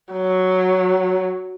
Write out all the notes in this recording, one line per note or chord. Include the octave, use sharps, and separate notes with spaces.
F#3